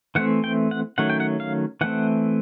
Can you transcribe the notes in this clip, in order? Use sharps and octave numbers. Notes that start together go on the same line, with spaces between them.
E3 A3 C4 F#5
G5
F#5
D#3 F#3 A3 C#4 F#5
G5
F#5
F5
E3 A3 C4 F#5